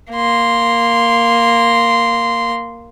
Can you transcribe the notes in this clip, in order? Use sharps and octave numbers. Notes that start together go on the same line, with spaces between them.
A#3 C6